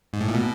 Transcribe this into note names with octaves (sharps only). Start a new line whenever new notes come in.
G#2
A2
A#2
B2